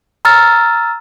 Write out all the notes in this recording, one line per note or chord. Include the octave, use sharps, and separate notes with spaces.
A#5 E6 F6 A6